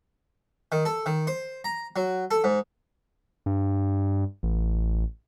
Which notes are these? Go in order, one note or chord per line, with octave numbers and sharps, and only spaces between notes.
D#3
A4
D#3
C5
A#5
F#3
A4
G#2
G2
A1